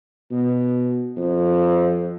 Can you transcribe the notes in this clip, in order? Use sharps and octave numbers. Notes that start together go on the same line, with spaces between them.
B2
F2